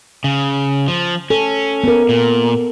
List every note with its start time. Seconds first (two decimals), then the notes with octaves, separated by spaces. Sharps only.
0.24 C#3
0.88 F3
1.30 C#4 A4
1.84 B3 A#4
2.09 A#2